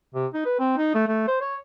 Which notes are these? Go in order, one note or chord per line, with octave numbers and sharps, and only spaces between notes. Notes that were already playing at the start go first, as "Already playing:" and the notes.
C3
D#4
B4
C4
D#4
A3
A3
C5
C#5